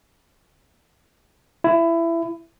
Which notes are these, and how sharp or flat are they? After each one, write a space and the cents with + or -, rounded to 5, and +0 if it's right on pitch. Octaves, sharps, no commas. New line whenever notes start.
E4 +20